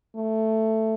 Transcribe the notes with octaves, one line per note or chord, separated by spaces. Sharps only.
A3